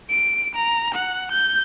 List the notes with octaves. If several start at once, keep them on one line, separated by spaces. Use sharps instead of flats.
D7
A#5
F#5
G6